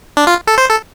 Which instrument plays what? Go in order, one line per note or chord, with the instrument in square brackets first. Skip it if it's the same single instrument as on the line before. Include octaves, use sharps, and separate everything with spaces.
[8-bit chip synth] D4
F4
A4
C5
A4